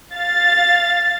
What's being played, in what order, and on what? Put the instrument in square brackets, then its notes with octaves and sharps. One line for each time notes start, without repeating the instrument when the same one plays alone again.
[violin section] F5 A6